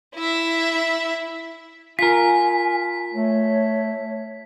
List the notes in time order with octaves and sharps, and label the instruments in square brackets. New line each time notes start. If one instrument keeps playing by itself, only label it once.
[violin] E4 E5
[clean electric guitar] F4 A#4 [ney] G#5 [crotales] B6
[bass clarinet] A3 [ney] C#5